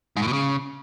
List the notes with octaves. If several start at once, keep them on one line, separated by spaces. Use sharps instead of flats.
G#2
A2
B2
C#3